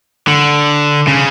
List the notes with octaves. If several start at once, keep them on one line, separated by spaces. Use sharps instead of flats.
D3
C#3